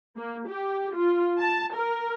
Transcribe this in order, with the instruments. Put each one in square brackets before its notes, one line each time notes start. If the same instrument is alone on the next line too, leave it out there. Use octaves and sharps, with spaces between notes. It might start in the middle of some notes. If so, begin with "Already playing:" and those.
[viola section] A#3
G4
F4
A5
A#4